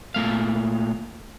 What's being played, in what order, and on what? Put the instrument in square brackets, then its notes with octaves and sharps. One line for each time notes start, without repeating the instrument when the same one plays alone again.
[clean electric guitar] A#2 A3 F5